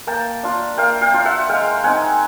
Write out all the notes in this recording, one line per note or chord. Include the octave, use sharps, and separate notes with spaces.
A#3 G5 A5
D4 F4
A#3 F5 G5
F5 G5
D4 F4
E5 F#5
G#3 F5 G5
C4 D#4 F#5 G#5